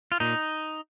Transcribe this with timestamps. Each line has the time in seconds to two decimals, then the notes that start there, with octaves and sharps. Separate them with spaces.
0.12 F4
0.20 A#2 D#4